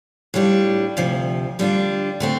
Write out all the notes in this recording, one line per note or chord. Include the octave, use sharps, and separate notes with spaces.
A2 G3 D4 F4
D2 C3 F3
D3 G3 D4 F4
D3 A3 C4